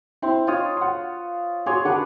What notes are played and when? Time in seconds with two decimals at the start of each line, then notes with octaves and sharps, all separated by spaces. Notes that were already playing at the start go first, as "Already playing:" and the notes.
0.22 C4 E4 C6
0.47 D#4 F4 C#5 D#6
0.77 F#5 C6
1.66 F#4 G#4 C#5 D5 C6
1.85 D#3 D4 G#4 B4 D5 F#5